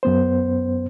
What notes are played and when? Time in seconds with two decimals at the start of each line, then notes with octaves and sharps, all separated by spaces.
0.03 F#2 B3 C5